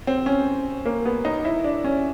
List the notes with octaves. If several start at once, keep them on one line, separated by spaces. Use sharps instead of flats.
C4
C#4
A#3
B3
D#4
E4
D4
C#4